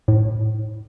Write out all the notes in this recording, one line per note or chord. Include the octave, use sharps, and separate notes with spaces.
A2